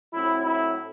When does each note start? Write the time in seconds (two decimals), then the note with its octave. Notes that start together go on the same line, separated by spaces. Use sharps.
0.13 A2 F#3 C4 E4
0.47 E4